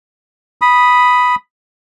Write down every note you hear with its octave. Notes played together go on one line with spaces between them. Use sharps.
B5 D#6